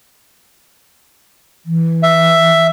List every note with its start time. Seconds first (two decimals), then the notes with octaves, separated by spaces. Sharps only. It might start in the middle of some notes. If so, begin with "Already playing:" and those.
1.66 E3
2.03 E5